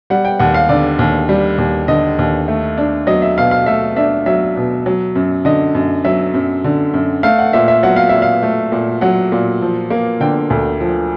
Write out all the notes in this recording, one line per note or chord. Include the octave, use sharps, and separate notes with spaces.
G3 F#5
G5
D#2 F#5
F5
D3 D5
D#2
G3
D#2
D3 D#5
D#2
A3
D4
F#3 D#5
E5
B2 F5
F5
A3 E5
D4 E5
F#3 E5
B2
F#3
F#2
D3 D#5
F#2
F#3 E5
F#2
D3
F#2
A3 F5
F#5
A#2 E5
E5
F#3 F#5
F5
A#2 E5
F5
A3
A#2
F#3 F#5
A#2
F3
A#3
D3 G5
D2
F3